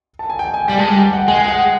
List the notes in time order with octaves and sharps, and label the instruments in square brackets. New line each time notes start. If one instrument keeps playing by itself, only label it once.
[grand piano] A5
G#5
G5
G#5
[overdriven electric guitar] G3 [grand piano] G5
[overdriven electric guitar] G#3 [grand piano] A5
[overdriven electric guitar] G3 [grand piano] G#5
[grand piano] G5
F#5
[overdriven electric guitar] G#3 [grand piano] G#5
[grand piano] G5
F#5